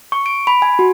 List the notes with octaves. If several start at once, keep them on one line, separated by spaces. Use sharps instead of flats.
C#6
D7
B5
G#5
F#4